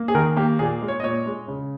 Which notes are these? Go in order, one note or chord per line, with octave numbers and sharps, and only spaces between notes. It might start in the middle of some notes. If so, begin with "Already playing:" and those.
Already playing: A#3
G#4
D#3 A#4
A#3 G4
A#2 G#4
G#3
C#5
D#5
A#2 C#5
G#3
C#3